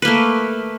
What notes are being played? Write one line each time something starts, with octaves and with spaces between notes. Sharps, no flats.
A3 A#3 B4